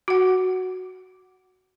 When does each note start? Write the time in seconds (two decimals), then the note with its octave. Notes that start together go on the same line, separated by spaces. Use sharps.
0.08 F#4 F#5